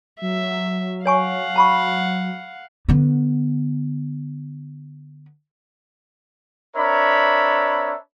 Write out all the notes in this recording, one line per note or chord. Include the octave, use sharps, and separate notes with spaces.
F#3 E5
C#5 F5 F#5 G#5 C#6
A5 B5 C#6
D3 B3
C4 D4 A#4 C#5 E5 B5